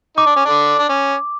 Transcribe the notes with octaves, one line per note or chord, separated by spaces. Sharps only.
D#4 D6
D4
C#4
D3 D4
D4
C#4